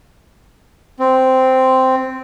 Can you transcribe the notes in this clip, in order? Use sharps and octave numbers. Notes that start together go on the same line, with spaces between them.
C4